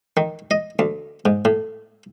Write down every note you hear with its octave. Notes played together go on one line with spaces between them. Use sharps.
D#3
D#5
D2
G#2
A2